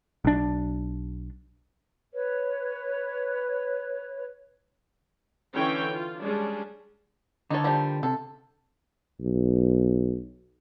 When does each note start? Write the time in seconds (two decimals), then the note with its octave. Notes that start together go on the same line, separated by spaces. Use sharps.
0.25 B1 D4
2.13 B4 C#5
5.54 D3 E3 C#4 C#5 G5
5.92 F4
6.21 G3 G#3 C#4 D4 G#4
7.50 D3 D#4 A4 C#5
7.64 D#3 F3 G3
8.03 C3 A4
9.20 B1